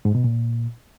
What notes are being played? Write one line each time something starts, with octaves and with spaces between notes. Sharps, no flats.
G#2
B2
A#2